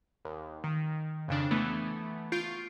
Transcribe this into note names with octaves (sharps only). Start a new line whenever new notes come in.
D#2
D#3
F2 C#3 D4
E3 A3 B3
F4 C#6 G6 C7 D7